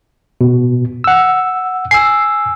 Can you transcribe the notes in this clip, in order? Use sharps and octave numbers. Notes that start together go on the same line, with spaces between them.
B2
F#5 E6
G#5 E6 C7